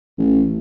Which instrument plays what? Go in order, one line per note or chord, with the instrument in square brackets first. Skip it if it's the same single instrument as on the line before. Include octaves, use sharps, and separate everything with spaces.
[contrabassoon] A1